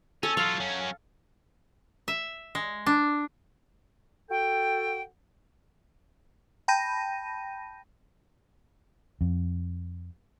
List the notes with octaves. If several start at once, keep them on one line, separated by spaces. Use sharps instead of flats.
C#4 A4
F#3 F4 F5
F#3 C#4
E5
G#3
D4
F#4 A4 G5
G5 A5 B5 G6 A#6 D#7
F2